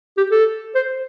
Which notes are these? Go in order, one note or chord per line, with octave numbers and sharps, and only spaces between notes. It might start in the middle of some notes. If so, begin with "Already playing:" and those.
G4
A4
C5